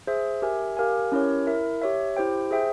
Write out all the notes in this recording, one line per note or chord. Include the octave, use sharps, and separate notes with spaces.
G#4 C5 E5
G4 A#4 E5 G#5
G4 A#4 F5 G#5
C#4 E4 G4 A#4 C#5
E4 A#4 E5
G4 C#5 E5
E4 G4 C5 G5
G#4 C5 E5 G5